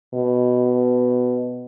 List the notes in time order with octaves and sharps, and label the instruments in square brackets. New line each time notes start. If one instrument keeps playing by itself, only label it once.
[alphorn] B2